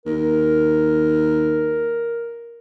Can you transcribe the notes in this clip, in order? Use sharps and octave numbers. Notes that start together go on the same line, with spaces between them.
D#2 A#4